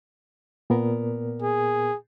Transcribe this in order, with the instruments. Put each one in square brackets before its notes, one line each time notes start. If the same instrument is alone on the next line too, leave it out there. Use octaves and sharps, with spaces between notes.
[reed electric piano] A#2 B3 A#4
[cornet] G#4